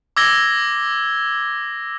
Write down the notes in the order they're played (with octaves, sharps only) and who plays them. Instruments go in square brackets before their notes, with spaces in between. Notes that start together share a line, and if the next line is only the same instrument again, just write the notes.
[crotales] D6 E6 G#6 A#6 G7